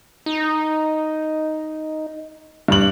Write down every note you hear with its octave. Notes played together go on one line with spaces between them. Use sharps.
D#4
G2 F#7